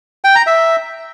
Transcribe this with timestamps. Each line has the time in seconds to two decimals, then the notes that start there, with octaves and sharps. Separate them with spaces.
0.24 G5
0.36 A#5
0.47 E5